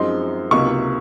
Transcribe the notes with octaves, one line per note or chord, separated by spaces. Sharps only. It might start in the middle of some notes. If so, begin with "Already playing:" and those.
Already playing: F#2 F3 G#3 C4 D#4 C6
C#2 C3 F#3 A#3 D#4 C#6